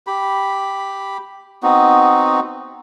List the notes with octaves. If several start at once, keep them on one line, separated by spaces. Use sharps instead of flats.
G4 B5
B3 C4 D#4 F#4